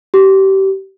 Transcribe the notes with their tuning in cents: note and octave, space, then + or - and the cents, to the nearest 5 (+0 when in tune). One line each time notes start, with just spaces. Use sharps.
G4 -25